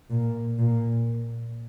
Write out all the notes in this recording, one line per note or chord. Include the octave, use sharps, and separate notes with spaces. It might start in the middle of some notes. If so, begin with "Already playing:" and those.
A#2
A#2